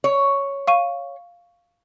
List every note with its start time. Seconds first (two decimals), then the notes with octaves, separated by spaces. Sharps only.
0.04 C#5
0.67 F5 C#6 D#7